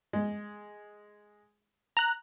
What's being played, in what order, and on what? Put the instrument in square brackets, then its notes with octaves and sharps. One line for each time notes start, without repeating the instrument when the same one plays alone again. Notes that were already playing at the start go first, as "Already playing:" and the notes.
[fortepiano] G#3
[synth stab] A#5 F#6